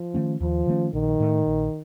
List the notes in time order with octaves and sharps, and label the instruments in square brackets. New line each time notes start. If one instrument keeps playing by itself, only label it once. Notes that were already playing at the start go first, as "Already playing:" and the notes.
Already playing: [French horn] F3
[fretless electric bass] D#3 A3 C#4
[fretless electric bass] D#2 [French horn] F3
[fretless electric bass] D#3 A3 C#4
[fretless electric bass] A#1 [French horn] D#3
[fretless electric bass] A2 A3
A#1